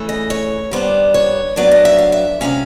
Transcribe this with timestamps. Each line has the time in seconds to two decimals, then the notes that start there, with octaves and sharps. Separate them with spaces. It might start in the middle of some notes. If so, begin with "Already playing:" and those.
Already playing: C#3 E3 A3
0.09 D#5
0.30 C#5
0.71 D#3 G3 B3 D4 C5
1.14 C#5
1.56 A2 F#3 B3 D4 D5
1.72 D#5
1.85 E5
1.98 F5
2.12 E5
2.41 C3 F3 G#3 C#4 F5